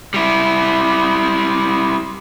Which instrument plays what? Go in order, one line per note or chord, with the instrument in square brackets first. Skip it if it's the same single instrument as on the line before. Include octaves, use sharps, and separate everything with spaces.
[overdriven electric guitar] G3 E4